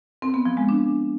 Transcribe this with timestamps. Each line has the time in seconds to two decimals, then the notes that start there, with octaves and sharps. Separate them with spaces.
0.22 C4
0.34 B3
0.45 F3
0.57 G#3
0.69 D4